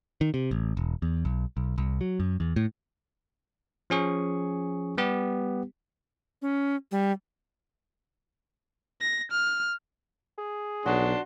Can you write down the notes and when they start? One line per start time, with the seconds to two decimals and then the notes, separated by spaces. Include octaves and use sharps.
0.21 D#3
0.34 C3
0.51 A1
0.77 E1
1.02 E2
1.25 B1
1.57 B1
1.78 C2
2.01 F#3
2.20 F#2
2.40 E2
2.56 A2
3.90 F3 C#4 G#4 C#6
4.98 G3 B3 G4
6.42 C#4
6.91 G3
9.01 A#6
9.31 F6
10.38 G#4
10.86 B1 F#3 D4 F#4 B4 C6